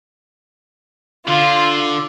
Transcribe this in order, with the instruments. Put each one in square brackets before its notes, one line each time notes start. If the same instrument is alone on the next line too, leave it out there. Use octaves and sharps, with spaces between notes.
[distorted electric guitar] D3 [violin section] F4